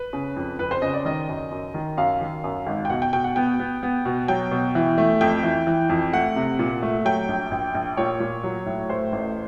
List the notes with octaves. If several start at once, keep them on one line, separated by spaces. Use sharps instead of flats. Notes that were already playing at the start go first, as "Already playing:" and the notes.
Already playing: B4
C#3
F2
F2 B4
C5
C#3 D#5
D5
D#3 D#5
F#2
F#2
D#3
F#2 F5
D#3
F#2
G#1
G5
B2 F#5
G5
B2 G5
F#5
B3 G5
B3
B3
B2
F#3 G5
B2
E3
A3
F2 G5
E3
E3
F2
A3 F#5
C3
A#2
A3
F#3 G5
A#1
A#1
A#1
A#2 C#5
A#2
F#3
A2
A3 C5
A1